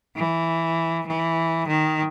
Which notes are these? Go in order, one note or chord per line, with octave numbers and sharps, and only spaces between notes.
E3
E3
D#3